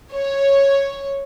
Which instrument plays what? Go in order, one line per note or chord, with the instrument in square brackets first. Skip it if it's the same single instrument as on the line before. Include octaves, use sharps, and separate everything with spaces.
[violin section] C#5